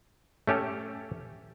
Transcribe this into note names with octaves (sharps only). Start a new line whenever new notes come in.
A3 C#4 G4 A4